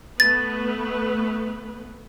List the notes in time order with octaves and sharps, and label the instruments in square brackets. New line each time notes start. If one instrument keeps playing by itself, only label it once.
[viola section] A3 B3 B4 [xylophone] A6